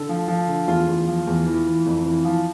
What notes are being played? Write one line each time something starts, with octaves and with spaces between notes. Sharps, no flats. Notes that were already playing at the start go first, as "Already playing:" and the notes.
Already playing: D3 A4
F3
F3
D3
E2 F4
E2
F3
E2
E3
E3
F2
E3
F3